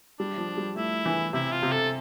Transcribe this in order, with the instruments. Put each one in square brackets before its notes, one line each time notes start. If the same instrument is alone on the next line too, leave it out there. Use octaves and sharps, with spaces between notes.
[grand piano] G3 [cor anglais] D4
[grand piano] F3
G3
[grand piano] A3 [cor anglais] E4
[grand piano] E3
[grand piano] C3 [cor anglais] E4
[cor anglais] F4
[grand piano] C3
[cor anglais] A4